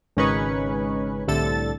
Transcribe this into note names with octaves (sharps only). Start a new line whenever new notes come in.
G#1 C#3 C#4 D#4 B4 C#6
C2 A2 D3 A4 A6